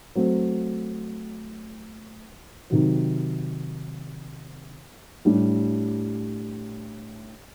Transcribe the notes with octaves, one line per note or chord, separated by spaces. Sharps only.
F#3 A3 C4
C3 D#3 F#3
A2 G3 D4 G4